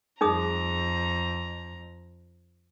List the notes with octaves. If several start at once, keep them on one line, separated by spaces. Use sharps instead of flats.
F2 D#4 G#4 A#5 D#6